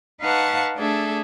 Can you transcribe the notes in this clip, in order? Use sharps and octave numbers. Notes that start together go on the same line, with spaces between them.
D#4 B4 F5 F#5 A5 C#6
A3 D4 G#4 A4 E5